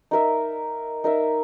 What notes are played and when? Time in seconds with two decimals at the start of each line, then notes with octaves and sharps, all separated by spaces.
0.11 D#4 A#4 E5
1.04 D#4 A#4 E5